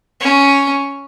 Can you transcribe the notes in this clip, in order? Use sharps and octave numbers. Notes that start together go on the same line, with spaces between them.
C#4